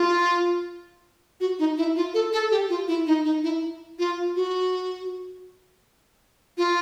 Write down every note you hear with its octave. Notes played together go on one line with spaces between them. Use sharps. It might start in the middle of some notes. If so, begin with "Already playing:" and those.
Already playing: F4
F#4
D#4
E4
F4
A4
A4
G4
F4
E4
D#4
D#4
E4
F4
F#4
F4